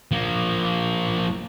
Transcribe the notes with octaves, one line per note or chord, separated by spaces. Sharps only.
F3 A#3